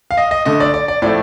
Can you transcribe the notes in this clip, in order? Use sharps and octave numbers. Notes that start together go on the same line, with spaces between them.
F5
D#5
D#5
D3 A3 D#5
D5
D5
D5
A2 F3 A3 D5